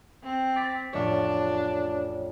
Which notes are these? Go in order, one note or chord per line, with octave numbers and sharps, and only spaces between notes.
C4
D6 A6 B6
A1 F2 D4 C#5